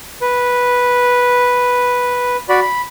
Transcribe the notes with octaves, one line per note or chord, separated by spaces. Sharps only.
B4
F#4 D5 B5
B5